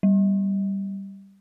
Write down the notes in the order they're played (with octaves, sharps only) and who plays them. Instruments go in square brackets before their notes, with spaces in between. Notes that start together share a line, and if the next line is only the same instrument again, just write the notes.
[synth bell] G3